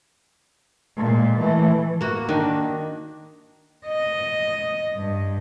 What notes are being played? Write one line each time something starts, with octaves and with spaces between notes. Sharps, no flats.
A#2 G#3
E3 A3
A#3 F#4
D#3 D4
D#5
G2